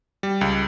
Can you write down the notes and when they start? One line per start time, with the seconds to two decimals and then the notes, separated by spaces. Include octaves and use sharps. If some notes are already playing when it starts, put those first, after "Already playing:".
0.23 G3
0.41 C#2